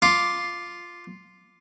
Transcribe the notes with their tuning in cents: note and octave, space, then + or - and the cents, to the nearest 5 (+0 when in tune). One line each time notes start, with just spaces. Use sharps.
F4 +0 D6 +0